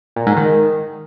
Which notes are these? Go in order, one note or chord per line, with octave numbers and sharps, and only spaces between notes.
A#2
G#2
D#3